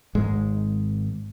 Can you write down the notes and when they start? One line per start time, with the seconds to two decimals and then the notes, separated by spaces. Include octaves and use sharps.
0.15 G#1 G#2 G#3